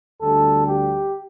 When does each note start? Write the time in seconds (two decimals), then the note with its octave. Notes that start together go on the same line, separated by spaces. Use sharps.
0.21 D2 D3 G3 A4
0.67 G4